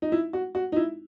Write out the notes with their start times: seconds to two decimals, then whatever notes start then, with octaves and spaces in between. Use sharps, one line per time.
0.02 D#4
0.12 E4
0.33 F#4
0.55 F#4
0.72 D#4
0.76 E4